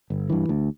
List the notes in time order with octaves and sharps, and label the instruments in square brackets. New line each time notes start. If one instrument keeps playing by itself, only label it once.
[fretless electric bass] G1
G2 E3
D2